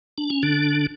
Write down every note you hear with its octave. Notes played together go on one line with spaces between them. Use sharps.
D4
C#4
D3 D4